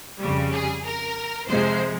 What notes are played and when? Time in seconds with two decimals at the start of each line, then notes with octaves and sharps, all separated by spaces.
0.20 F2 C#3 G3
0.52 G#4
0.84 A#4
1.47 F2 C3 F3 G#3 C5